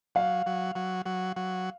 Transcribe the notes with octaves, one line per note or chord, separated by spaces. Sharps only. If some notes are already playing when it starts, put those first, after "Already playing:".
F#3 F5
F#3
F#3
F#3
F#3